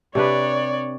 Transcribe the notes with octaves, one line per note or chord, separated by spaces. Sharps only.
C3 D4 B4 C#5 D5